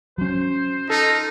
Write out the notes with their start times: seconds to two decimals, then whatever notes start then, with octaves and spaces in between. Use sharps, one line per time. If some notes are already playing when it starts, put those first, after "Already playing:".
0.18 F#3 C#4 C5
0.90 D#4 F4 A4